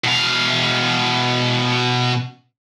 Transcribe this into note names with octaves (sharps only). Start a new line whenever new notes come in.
B2 F5